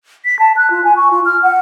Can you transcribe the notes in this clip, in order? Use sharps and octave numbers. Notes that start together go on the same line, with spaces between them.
B6
A5
F#6
F4
G#5
C#6
F4
F6
F#5